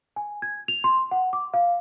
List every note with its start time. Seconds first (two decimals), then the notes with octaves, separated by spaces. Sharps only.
0.16 G#5
0.42 G#6
0.68 F7
0.84 C6
1.11 F#5
1.33 D6
1.54 F5